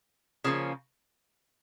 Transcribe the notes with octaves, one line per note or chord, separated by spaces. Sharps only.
C#3 F3 A#3 C#4